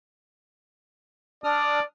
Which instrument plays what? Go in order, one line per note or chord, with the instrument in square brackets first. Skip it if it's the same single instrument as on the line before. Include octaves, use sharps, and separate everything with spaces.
[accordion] D4 D#6 F6 [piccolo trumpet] D5